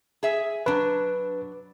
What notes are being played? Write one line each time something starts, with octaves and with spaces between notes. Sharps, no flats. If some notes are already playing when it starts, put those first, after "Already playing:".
G#4 E5
F#3 D4 B4